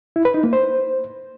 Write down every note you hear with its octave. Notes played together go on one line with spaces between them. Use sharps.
E4
B4
D#4
A#3
C5